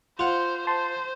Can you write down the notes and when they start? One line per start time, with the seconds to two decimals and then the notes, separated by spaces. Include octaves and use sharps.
0.19 F4 C5 F#5
0.67 C5 A5 C6